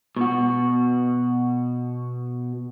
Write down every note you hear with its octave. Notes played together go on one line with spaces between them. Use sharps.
B2 F#4